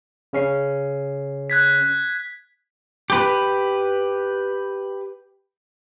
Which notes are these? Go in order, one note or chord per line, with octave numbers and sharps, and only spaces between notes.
C#3 C#4 C7
F#6 G#6 B6
G4 B4